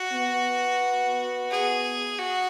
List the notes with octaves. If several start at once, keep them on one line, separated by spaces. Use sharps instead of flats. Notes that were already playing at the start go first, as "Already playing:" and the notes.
Already playing: F#4
B3
G#4
F#4